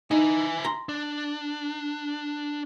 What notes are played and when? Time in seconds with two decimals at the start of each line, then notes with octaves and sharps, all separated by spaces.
0.11 D#4 E4 G#5
0.65 A#5 C6
0.89 D4